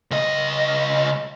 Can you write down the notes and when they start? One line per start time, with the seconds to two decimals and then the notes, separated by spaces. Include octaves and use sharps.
0.11 C#2 D#5